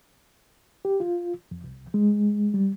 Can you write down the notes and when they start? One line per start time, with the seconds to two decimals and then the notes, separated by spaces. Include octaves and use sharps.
0.85 G4
1.00 F4
1.51 F2
1.64 C2
1.94 G#3
2.54 G3